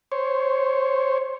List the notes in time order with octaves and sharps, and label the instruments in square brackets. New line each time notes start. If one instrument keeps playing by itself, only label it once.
[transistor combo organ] C5 C#5